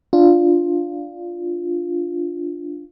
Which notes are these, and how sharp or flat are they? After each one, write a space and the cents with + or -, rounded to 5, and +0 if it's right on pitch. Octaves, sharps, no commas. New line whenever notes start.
D4 +0 F4 +0